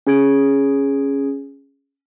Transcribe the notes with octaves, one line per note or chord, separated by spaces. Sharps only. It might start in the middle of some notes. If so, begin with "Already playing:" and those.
C#4 G#4 G#6 D7